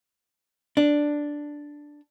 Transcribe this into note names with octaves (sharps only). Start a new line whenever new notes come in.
D4